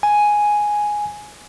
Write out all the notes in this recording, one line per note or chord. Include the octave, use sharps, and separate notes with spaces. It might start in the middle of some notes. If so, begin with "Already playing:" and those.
G#5